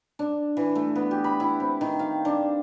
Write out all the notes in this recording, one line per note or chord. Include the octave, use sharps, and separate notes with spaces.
D4
E3
A3
B3
G4
B5
E4
C4
D#3
F5
D4